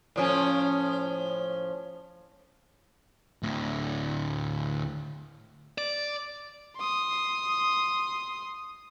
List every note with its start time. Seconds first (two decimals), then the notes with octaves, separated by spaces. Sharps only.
0.16 A2 F3 C#4
3.43 D2 A2
5.78 D5
6.77 C6 D#6